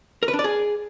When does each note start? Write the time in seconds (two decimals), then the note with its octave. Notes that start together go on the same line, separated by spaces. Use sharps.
0.23 A#4
0.28 B4
0.33 D4
0.39 D5
0.44 G#4